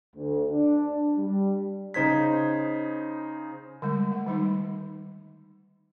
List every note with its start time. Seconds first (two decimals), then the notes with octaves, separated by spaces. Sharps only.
0.16 D2
0.52 D4
1.17 G3
1.94 C#3 D#4 C5 G#6 B6
3.82 D3 G3 G#3
4.11 A3
4.26 D#3 G3 D#4